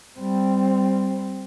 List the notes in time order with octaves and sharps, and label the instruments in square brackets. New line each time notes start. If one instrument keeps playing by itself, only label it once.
[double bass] G3 C4